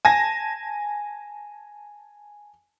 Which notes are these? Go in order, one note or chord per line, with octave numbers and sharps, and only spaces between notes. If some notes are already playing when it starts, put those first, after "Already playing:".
G#5 A5 A#6